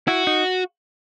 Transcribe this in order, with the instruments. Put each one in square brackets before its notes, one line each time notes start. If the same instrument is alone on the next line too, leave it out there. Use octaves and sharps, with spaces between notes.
[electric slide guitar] E4 [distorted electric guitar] F#4
[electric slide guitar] D#4